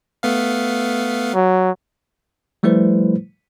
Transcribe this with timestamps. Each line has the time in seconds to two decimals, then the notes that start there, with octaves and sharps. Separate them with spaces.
0.23 A3 B3 F5
1.34 F#3
2.63 F3 G3 A3 E4 B4 C5